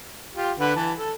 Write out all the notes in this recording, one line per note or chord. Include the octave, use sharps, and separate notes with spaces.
F4 G4
D3 B4 F#5
E3 A5
A4